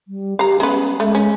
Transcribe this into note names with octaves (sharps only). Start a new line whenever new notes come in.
G3
G4 F5 A#5
G#3 B3 C#4
G#3 A3
C#4